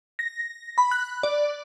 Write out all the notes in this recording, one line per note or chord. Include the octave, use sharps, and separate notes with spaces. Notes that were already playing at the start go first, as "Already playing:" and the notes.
A#6
B5
F#6
D5